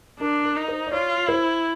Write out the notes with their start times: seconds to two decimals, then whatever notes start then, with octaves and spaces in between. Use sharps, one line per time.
0.19 D4 A#4
0.44 A#4
0.56 D#4
0.68 C5
0.87 D5
0.92 F4 C#5
1.28 E4 C5